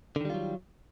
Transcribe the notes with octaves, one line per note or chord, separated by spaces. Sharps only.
D3 D#3 F#3 G3 F4